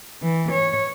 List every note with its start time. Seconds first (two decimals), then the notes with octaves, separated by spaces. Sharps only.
0.22 E3
0.52 C#5